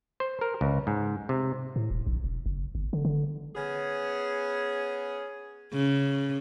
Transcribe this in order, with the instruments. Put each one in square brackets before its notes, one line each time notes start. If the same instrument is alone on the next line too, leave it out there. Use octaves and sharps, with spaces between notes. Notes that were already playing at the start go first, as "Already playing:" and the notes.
[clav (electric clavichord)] C5
A#4
C#2
G#2
C3
[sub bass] A2
D#1
A#1
E1
F#1
G1
D3
D3
[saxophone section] B3 C#4 G#4
[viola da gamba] C#3